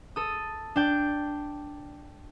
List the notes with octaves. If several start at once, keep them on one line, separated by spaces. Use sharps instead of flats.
A4 D#6
D4 G5